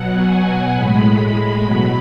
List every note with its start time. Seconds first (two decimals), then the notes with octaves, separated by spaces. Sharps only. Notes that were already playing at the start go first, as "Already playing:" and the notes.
Already playing: B2 F#3 F#5
0.14 G#5
0.43 F#5
0.74 A2 G#3 B5
1.20 B5
1.64 B2 F#3 B5